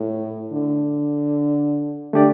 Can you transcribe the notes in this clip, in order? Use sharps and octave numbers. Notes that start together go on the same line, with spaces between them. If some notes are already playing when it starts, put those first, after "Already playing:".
Already playing: A2
D3
D3 A3 D4 G4 D5